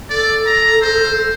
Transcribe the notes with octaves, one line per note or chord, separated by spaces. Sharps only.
A4 D5
A#5
C5